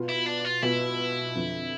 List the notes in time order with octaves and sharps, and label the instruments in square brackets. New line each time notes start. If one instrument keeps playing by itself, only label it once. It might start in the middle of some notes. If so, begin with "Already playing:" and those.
Already playing: [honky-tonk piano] B2 B3 F4
[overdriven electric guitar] E4
D4
F4
[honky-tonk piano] B2 B3 F4 [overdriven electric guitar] E4
[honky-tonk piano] F2 D3 F3